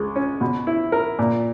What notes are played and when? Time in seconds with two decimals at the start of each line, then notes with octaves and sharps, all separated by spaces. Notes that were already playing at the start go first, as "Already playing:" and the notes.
Already playing: C#2 G#3
0.16 C#4
0.41 B2
0.67 E4
0.92 A#4
1.19 A#2